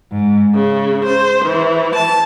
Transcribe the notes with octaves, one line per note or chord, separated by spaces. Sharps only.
G#2
C#3
C5
E3
A5